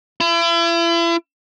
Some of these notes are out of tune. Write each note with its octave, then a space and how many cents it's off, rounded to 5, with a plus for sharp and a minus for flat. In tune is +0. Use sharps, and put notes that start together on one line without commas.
E4 +40